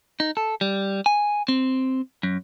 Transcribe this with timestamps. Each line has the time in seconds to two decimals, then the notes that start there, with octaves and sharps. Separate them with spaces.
0.20 D#4
0.37 A4
0.61 G3
1.06 G#5
1.48 C4
2.23 F#2